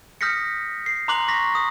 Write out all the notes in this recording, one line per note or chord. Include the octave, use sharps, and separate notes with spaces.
D#6 F6 G6 A#6 B6 C#7
C7
A#5 C6 D6 F#6 F#7
C#6 A#6 B6
D#6